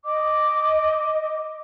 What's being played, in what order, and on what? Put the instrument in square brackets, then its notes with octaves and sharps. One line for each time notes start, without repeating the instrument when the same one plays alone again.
[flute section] D#5 D6